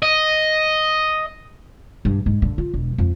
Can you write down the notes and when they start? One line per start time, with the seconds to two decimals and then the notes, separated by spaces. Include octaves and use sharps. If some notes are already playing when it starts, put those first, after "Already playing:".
0.03 D#5
2.05 G2
2.26 G#2
2.42 D3
2.58 F4
2.74 E1
2.98 F2